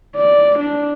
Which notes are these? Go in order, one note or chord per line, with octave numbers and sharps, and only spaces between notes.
D5
D4